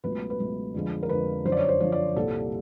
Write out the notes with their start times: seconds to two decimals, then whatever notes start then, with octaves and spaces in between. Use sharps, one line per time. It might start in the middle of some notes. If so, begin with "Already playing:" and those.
0.03 C#2 B2 F#3 A3 B4
0.30 B4
0.39 C#2 B2 F#3 A3
0.74 F2 D3 F3 G#3
1.03 A#4
1.09 F2 D3 F3 G#3 B4
1.45 F#2 D3 F3 C5
1.52 D5
1.57 C#5
1.69 C5
1.80 F#2 D3 F3 C#5
1.92 D5
2.16 C2 A#2 G3 A4